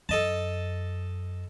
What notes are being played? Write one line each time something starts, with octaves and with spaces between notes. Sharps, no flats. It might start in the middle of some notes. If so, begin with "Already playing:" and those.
F#2 A4 D#5 A5